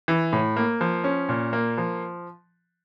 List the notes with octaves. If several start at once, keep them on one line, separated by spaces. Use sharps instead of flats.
E3
A2
A#3
F3
C#4
A#2
A#3
F3